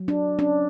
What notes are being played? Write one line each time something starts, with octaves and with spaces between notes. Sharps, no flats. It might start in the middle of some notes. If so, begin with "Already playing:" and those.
Already playing: F#3
D4
C#4 D4